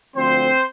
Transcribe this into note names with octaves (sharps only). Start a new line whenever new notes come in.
D2 D3 F3 C4 C5